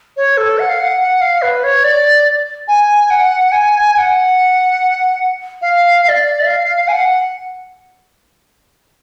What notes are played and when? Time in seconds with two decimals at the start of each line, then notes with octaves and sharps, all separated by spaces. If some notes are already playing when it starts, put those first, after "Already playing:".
0.17 C#5
0.37 A4
0.59 F#5
0.69 F5
0.80 F#5
1.00 F#5
1.21 F5
1.42 B4
1.64 C#5
1.84 D5
2.68 G#5
3.10 F#5
3.52 G#5
3.94 G#5
3.98 F#5
5.62 F5
6.04 F5
6.09 D5
6.46 F5
6.88 G#5
6.92 F#5